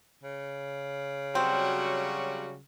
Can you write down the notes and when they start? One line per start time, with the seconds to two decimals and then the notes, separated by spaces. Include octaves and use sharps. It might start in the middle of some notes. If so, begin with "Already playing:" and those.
0.23 C#3
1.35 F#3 G3 C4 F#4